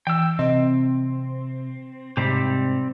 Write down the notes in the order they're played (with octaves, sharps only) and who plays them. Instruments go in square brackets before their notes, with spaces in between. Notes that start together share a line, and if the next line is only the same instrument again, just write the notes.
[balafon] E3 [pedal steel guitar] G5 E6
[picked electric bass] C3 [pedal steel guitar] C4 [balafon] D#5
[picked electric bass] G#2 C3 [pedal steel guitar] G3 C4 G4